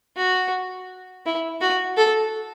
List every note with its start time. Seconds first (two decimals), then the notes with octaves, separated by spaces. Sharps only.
0.17 F#4
1.26 E4
1.61 F#4
1.97 A4